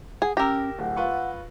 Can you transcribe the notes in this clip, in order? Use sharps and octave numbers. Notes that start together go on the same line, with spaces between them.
G#4 F#5
C#4 G4 A#4 E6 A#6
D1 F#5
F4 B4 C#6